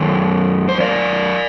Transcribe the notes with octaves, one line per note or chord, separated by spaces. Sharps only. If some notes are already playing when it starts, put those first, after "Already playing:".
Already playing: F#2 D#3
C5
A#4 D5